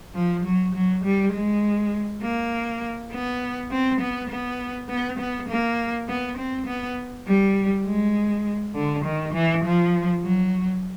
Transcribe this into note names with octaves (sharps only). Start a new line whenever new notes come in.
F3
F#3
F#3
G3
G#3
A#3
B3
C4
B3
B3
B3
B3
A#3
B3
C4
B3
G3
G#3
D3
D#3
E3
F3
F#3